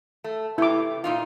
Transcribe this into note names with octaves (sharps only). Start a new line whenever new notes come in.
A3
C3 A3 E4 D6
A#2 D#4 F4